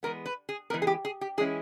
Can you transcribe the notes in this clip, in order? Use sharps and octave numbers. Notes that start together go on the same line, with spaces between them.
E3 G#3 B3 A#4
B4
G#4
E3 G#3 B3 A#4
G#4
G4
G#4
G4
E3 G#3 C#4 E4 G#4